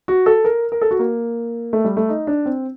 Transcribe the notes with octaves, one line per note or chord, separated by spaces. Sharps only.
F#4
A4
A#4
A#4
A4
F#4
A#3
A3
G3
A3
D#4
D4
C4